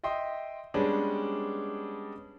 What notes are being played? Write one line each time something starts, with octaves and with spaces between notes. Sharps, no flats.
D#5 E5 G5 C6
G3 G#3 B3 C#4 D4